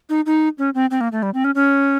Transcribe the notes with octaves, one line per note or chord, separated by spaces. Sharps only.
D#4
D#4
C#4
C4
C4
A#3
A3
G3
C4
C#4
C#4